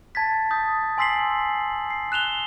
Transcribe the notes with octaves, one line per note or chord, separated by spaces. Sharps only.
A5 G#6 A6 B6
D#6 G6 A6
G#5 C6 E6 B6 C7 F#7
C7
F#6 E7 F7 G7